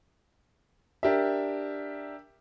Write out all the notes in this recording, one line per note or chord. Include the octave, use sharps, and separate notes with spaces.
D4 G4 A#4 E5